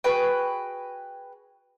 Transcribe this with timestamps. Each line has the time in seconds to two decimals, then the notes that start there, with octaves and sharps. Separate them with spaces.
0.04 F#4 G#4 B4 G5